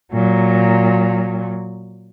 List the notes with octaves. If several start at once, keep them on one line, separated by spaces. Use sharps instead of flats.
A#2 F#3